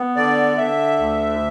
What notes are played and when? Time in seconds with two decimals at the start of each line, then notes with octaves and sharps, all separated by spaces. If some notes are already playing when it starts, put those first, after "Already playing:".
Already playing: B3
0.16 D3 D5
0.57 D3 E5
0.98 D2